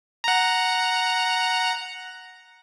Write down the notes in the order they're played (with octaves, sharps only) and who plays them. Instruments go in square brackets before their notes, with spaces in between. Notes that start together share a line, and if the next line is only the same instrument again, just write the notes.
[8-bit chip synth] F#5 A#5